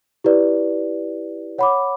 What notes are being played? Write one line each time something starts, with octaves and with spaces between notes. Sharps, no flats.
E4 G4 B4 D5
C#5 F#5 B5 D6